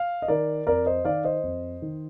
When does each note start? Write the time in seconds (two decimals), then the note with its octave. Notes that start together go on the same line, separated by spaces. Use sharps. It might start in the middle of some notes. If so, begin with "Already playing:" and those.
Already playing: F5
0.22 D#5
0.28 D#3 A#4 D5
0.67 F2 A#4 D5
0.86 C5 D#5
1.05 D#3 D5 F5
1.24 C5 D#5
1.43 F2
1.82 D#3